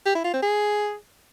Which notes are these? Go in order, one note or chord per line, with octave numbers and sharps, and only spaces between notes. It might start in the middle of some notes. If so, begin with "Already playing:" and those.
G4
E4
F4
C4
G#4